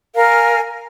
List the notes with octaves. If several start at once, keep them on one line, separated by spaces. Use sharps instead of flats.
A#4 F5 G#5 F6